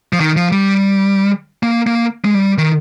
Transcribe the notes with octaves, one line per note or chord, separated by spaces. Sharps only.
F3
D#3
F3
G3
A#3
A#3
G#3
G3
D#3